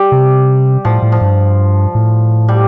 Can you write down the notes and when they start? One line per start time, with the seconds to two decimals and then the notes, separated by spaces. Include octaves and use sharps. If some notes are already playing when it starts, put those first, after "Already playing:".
Already playing: G3
0.12 C3
0.85 A2 F3
1.02 A2
1.12 F3
1.21 G2
1.95 A2
2.48 G3